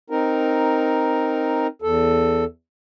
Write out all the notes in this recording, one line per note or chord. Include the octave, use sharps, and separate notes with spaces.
C4 D#4 A#4
E2 A4